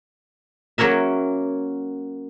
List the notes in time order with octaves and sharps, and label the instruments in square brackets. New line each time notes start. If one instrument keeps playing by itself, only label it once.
[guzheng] F#3 A#3 C#4 A#4 E5